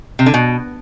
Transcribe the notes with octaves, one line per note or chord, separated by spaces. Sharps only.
C3
D3
B2